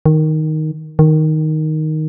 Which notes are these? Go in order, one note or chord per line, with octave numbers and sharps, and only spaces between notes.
D#3
D#3